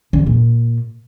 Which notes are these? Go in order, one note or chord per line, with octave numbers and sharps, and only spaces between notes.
D3
E2
A#2